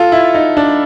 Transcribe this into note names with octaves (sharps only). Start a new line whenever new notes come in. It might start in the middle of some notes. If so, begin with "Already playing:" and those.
Already playing: F4 A4
E4
D#4
D4